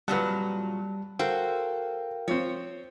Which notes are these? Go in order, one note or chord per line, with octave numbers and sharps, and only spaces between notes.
F2 A#2 F#3 G3 B4 F#5 A5
F#4 A4 A#4 C5 F5 G5
F3 C4 C#5